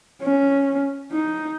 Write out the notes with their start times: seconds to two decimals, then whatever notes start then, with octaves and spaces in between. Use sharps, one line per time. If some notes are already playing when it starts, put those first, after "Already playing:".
0.23 C#4
1.12 D#4